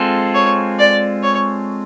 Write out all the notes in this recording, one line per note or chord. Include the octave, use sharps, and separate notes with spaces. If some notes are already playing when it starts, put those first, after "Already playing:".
Already playing: G#3 C4 F4 A4
C#5
D5
C#5